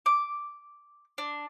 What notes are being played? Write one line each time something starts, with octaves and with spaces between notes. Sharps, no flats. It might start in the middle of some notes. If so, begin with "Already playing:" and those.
D6
D4